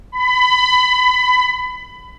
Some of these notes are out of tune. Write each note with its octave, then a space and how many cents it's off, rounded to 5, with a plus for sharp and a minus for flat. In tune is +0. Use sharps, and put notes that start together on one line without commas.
B5 +25